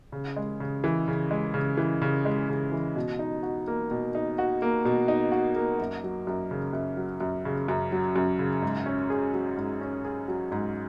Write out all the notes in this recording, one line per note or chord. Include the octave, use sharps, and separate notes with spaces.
C#3
G#3
C#3
E3
C#3
G#3
C#3
E3
C#3
G#3
C#3
E3
B2
D#4
F#4
A#3
B2
D#4
F#4
A#3
B2
D#4
F#4
A#3
F#2
F#3
F#2
C#3
F#2
F#3
F#2
C#3
F#2
F#3
F#2
C#3
G#2
C#4
G#4
F#3
G#2
C#4
G#4
F#3
G#2